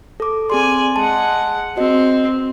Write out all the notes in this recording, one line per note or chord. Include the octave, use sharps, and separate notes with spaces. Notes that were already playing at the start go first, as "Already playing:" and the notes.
A4 D6
C4 G#4 D5 G#5 C6
G#3 F#5 A5
C4 F#4 D#5